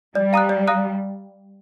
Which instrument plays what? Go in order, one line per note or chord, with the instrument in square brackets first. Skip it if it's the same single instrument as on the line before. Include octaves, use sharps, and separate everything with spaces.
[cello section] G3 [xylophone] D5
[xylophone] F5 A#5 D#6 F#6
D5
F5 A#5 D#6 F#6